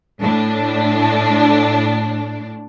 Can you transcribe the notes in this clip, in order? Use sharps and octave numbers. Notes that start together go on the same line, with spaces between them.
A2 D4